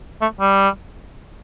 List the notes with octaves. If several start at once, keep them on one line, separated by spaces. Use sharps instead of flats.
A3
G3